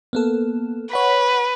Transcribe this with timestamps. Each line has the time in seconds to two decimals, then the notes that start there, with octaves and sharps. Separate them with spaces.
0.13 A#3 B3 A4
0.92 B4 C#5 F#5 B6